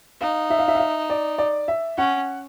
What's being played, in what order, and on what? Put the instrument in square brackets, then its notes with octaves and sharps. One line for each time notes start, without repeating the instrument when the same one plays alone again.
[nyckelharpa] D#4 [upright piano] F5
[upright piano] E5
F5
E5
F5
E5
D5
D5
E5
[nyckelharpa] C#4 [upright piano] F#5